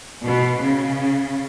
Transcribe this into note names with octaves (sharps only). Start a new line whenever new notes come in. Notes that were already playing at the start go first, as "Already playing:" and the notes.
B2
C#3